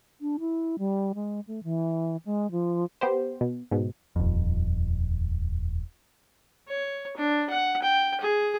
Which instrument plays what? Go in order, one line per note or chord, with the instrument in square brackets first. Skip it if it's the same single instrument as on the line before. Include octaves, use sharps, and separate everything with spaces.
[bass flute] D4
E4
G3
G#3
A3
E3
G#3
F3
[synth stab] B3 G4 C5
B2
G#2 B2
[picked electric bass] D#1 F2
[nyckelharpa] C#5
D4
F#5
G5
G#4